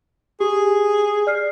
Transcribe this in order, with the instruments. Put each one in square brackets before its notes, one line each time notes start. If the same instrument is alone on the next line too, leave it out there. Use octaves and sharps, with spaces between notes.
[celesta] G4 [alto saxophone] G#4
[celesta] D5 F6 C7